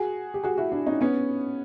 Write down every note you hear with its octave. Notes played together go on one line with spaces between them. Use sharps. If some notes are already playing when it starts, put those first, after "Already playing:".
Already playing: F#4 G#4
G4
F#4 G#4
E4 F#4
D4 E4
C#4 D#4
B3 C#4